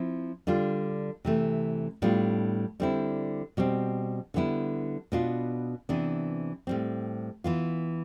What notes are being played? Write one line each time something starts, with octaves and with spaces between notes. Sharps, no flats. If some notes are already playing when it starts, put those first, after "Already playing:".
Already playing: F3 C4 E4
D3 G3 D4 F4
C3 E3 A3
A2 G3 B3 D4 F4
D3 G3 C4 E4
B2 G3 C4
D3 G3 B3 E4
B2 B3 D4 F4
C3 E3 B3 D4
A2 G3 C4
E3 B3 F4